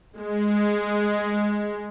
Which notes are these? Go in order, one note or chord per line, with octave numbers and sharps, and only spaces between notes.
G#3